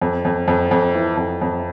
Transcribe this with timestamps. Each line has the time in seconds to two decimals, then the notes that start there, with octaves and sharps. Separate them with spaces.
0.02 F2
0.25 F2
0.48 F2
0.71 F2
0.94 E3
1.17 F2
1.42 F2